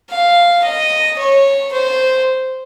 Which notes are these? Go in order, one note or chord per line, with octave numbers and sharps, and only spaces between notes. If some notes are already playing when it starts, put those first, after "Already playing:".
F5
D#5
C#5
C5